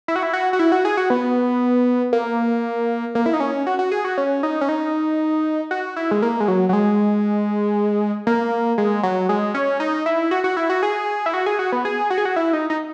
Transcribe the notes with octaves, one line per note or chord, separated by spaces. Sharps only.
E4
F#4
E4
F#4
F#4
E4
F#4
G#4
F#4
B3
A#3
A#3
E4
D#4
C#4
F#4
F#4
G#4
F#4
C#4
D#4
C#4
D#4
F#4
E4
G#3
A#3
G#3
F#3
F#3
G#3
A#3
G#3
F#3
G#3
C#4
D#4
E4
F#4
F#4
E4
F#4
G#4
E4
F#4
G#4
F#4
B3
G#4
F#4
G#4
F#4
E4
D#4
D#4